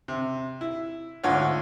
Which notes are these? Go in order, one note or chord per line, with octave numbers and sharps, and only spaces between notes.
C3
E4
D2 G#2 D3 F4 C#5 F#5